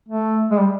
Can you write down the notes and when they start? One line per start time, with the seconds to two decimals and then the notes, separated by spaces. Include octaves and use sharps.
0.09 A3
0.51 G#3
0.59 G3